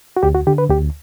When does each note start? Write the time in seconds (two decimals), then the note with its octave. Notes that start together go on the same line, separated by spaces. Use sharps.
0.17 F#4
0.23 D2 G4
0.35 F#4
0.47 D3 G4
0.58 B4
0.70 D2 G4